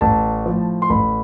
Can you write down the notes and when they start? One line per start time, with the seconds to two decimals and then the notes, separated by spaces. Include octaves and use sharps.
0.01 A1 A5
0.46 A2 F3
0.82 C6
0.90 A1 B5